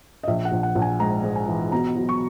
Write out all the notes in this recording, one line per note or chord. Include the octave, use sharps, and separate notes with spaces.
D#5
A#1 E5
F#5
A#1
F#5
A#1
G#5
G#2 A#5
G#2
G#5
E3
B2 A#5
F#3
C#6